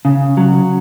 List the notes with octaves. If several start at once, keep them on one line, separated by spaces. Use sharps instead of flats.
C#3
F#3